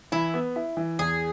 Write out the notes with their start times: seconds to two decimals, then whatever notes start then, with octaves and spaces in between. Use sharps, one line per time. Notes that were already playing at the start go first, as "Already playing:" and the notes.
0.12 E3 E4
0.34 B3
0.56 E4
0.77 E3
0.99 E2 G#4